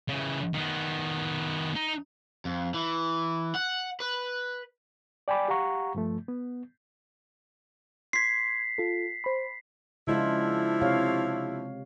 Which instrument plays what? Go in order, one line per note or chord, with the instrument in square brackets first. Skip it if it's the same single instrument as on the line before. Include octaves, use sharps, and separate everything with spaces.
[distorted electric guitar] C#3 E3
D#3 B3
D#4
[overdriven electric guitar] F2
E3
F#5
B4
[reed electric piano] D5 G5 G#5 B5 D6
G4 F5 F#5 A#5 C#6
G2 F3 A3
B3
[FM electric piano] C6 G#6 [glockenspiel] B6 C7
[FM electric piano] F4 A4
C5 B5
[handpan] C#3 G#3 F4 [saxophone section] F3 D4 E4
[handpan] C3 C#5 F5